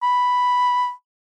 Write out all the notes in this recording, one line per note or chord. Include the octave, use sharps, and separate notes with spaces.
B5